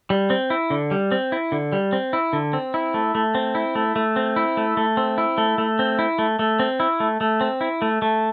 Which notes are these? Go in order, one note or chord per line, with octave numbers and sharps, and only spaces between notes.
G3
C4
E4
D3
G3
C4
E4
D3
G3
C4
E4
D3
C4
E4
A3
A3
C4
E4
A3
A3
C4
E4
A3
A3
C4
E4
A3
A3
C4
E4
A3
A3
C4
E4
A3
A3
C4
E4
A3
A3